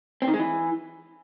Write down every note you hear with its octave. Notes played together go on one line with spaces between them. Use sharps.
C4
D#3
G#3
E3